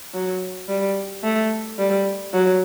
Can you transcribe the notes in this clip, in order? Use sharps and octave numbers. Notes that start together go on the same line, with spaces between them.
F#3
G3
A3
G3
F#3